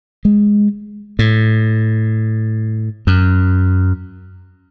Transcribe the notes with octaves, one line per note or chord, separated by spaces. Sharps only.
G#3
A2
F#2